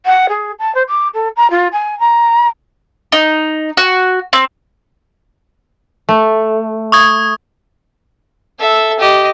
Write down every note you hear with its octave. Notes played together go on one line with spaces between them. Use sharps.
F#5
G#4
A5
C5
D6
A4
A#5
F4
G#5
A#5
D#4
F#4
C4
A3
C#6 D#6 G#6
A4 E5
G4 D#5